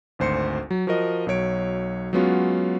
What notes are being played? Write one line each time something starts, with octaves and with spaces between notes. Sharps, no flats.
G#1 D2 C5 C6 C#7
F#3
F3 F#4 A#4 D#5
B1 F#3 C#5 D7
F#3 G#3 B3 C#4 F4 F#4